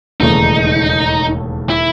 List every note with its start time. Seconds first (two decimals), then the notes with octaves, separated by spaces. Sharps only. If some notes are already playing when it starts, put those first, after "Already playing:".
0.20 E1 D#2 C#3 E3 A3 D#4
1.70 E4